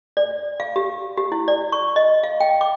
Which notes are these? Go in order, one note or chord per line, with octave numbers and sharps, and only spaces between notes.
D5
F5
G4
G4
E4
D5
C#6
D#5
F5
G5
D6